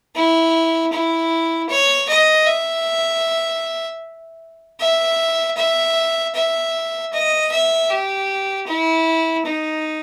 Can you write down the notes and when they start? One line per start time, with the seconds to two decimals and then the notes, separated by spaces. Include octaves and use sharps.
0.15 E4
0.93 E4
1.69 C#5
2.09 D#5
2.47 E5
4.80 E5
5.57 E5
6.35 E5
7.13 D#5
7.52 E5
7.90 G4
8.67 E4
9.45 D#4